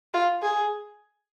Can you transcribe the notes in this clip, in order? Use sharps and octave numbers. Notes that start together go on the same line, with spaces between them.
F4
G#4